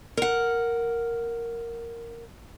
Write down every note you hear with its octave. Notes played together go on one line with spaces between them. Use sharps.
A#4 F#5